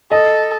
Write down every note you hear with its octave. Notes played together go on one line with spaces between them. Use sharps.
A4 D#5